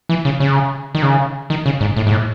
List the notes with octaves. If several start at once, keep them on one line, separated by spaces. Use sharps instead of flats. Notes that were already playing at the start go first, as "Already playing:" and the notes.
E3
C#3
C#3
D#3
C#3
D#3
C#3
G#2
A2
G#2
A2